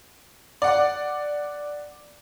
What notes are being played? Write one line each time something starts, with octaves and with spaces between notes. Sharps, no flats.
D5 F#5